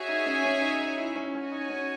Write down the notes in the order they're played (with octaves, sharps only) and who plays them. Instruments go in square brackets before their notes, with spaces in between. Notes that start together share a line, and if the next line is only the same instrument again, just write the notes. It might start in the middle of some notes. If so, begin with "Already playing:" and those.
Already playing: [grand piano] F#4 [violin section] G#4 C#5 E5 G#5
[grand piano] D#4
C#4
C#4
D#4
D#4
E4
C#4
[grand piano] C#4 [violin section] F#4 C#5 G#5
[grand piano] D#4
C#4